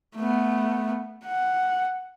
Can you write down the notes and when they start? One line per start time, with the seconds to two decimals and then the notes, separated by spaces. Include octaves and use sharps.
0.16 A3 B3
1.25 F#5